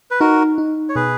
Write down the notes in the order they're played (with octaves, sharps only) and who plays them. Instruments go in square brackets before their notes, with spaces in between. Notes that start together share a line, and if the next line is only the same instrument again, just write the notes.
[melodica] B4
[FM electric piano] D#4 [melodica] F#4 A#4
[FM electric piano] D#4
[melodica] C#5
[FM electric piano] B2 [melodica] G#4 B4